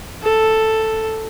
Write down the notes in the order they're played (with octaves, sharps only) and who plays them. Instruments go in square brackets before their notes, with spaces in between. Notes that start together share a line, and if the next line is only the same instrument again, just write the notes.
[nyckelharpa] A4